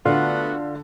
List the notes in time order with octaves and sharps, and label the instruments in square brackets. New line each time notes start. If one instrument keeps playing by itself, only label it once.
[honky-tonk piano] D3 [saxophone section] A3 B3 F#4 [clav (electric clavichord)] F4